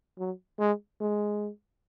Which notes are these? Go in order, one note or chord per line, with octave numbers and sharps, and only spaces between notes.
F#3
G#3
G#3